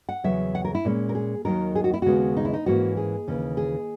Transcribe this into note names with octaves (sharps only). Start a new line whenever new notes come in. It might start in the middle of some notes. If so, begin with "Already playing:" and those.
F#5
E2 C#3 F#3 E5
F#5
A#4
E4
A#2 G#3 C#4
A#4
G#4
D#2 D#3 F#3 A#4
G#4
F#4
E4
D#2 C#3 G#3 B3 F#4
D#4
E4
D#4
G#2 E3 A#3 C#4 F#4
G#4
D#2 C#3 E3
G#4